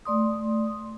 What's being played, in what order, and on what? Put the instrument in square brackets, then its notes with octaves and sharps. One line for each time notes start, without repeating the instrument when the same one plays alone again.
[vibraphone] A3 D5 C6 D#6